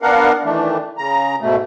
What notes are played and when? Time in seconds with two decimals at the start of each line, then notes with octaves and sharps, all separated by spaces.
0.02 B3 D4 A#4 F5 F#5
0.44 D#3 E3 A3 D4
0.98 C#3 A#5
1.41 G#2 B2 A3